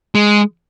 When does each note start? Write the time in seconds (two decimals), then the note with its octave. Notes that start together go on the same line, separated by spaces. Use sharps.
0.15 G#3